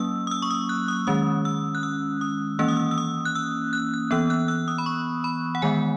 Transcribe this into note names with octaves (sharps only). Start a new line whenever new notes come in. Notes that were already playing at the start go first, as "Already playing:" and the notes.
Already playing: F#3 A#3 C#4 D#6 E6
D#6
E6
C#6
D#6
F#6
D#6
D#3 G#3 C#4 D#6
E6
F#6
E6
D#6
E3 A#3 C#4 E6
D#6
E6
E6
D#6
F#6
E6
F#6
F#6
E3 B3 E6
F#6
E6
D#6
B5
C#6
B5
F#5
D#3 G#3 B3 G#5